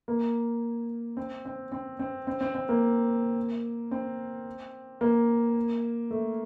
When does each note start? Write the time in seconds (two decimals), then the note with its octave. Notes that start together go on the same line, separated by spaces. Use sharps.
0.08 A#3
1.17 C4
1.45 C4
1.72 C4
1.99 C4
2.27 C4
2.41 C4
2.54 C4
2.69 A#3
3.91 C4
5.01 A#3
6.11 A3